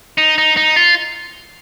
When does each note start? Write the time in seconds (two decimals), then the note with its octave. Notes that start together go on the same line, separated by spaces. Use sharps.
0.18 D#4
0.38 D#4
0.57 D#4
0.76 F4